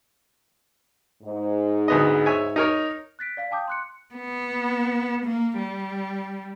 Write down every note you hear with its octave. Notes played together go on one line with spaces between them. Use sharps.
G#2
D2 B3 D#5
C#5 E5 G#5
D#4 A#4 C#5
F#6 A6 B6 D7
D5 F5 B6
F5 G5 A5 D6 D#6 G6
C6 F#6 C#7
B3
A#3
G3